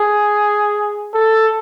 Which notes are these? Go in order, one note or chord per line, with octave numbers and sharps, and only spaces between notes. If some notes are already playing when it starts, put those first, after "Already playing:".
Already playing: G#4
A4